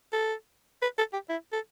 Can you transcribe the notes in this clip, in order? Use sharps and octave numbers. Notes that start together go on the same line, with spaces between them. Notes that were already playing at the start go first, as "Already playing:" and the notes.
A4
B4
A4
G4
E4
A4